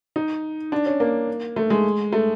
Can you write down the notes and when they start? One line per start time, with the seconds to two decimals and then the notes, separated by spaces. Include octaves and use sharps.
0.16 D#4
0.72 D4
0.86 C#4
1.00 A#3
1.56 A3
1.70 G#3
2.13 A3